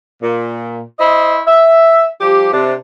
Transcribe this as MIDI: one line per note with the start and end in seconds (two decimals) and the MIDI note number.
0.23 0.82 46
0.99 1.40 64
0.99 1.40 72
0.99 1.40 75
1.47 2.06 76
2.21 2.51 53
2.21 2.51 55
2.21 2.51 67
2.53 2.73 48
2.53 2.73 62